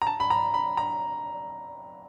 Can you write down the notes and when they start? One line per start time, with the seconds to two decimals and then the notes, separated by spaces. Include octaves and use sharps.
0.02 A#5
0.07 A5
0.20 B5
0.30 A#5
0.54 B5
0.77 A#5